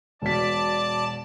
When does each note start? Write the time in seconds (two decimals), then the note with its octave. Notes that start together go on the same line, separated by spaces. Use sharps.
0.22 E1 B2 D5 A5 B6